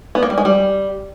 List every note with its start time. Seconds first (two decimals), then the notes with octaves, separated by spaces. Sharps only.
0.15 B3
0.23 A#3
0.30 G3
0.38 G#3
0.45 G3